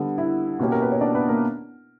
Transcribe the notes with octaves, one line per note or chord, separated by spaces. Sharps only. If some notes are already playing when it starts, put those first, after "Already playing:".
Already playing: D3 G3 B3
E4 E5
B2 A#3 C#4 G4
A#4
B4
C#5
D4 D5
B3 B4
A#3 A#4